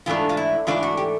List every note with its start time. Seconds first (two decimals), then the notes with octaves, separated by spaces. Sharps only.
0.06 G#2 E3 A3 D4 F4
0.29 F4
0.37 E4
0.67 G#2 E3 A3 D4 F4
0.83 F#4
0.97 G4